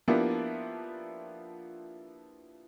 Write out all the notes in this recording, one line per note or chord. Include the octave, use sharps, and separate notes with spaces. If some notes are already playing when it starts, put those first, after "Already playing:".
F3 A#3 B3 D4 E4 G4